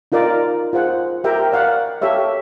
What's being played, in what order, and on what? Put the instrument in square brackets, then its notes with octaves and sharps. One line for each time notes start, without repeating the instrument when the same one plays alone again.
[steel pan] D#4 F4 A#4 D5
F4 G#4 C5 F#5
G4 A#4 E5 G5 A#5
D5 F5 F#5
G4 A4 C#5 E5 F5